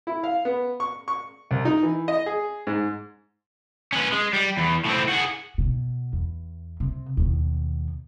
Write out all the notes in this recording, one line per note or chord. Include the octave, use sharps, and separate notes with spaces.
E4
F5
B3
C#6
C#6
C2
D#4
E3
D#5
G#4
G#2
C#4 B4
G#3
G3
E2
A2 C4
F#4 G#4
B2
E2
C3
D#2 B2